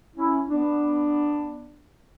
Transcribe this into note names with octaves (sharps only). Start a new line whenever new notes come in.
C#4 E4
B3 D4